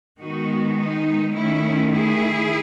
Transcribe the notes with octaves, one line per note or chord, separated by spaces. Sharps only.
D#3 G#3 B3 D#4 F#4
D#4
D#3 A3 C#4 E4
E4 G#4